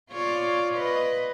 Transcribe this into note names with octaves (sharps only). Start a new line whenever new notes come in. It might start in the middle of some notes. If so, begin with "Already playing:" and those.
F4 C#5 D5
B4 D#5